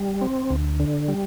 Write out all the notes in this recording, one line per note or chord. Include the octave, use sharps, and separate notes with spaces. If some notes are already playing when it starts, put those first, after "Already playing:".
Already playing: G3
C4
D2
D3
G3